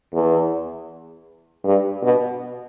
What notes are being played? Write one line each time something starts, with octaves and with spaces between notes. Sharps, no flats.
E2
G2
B2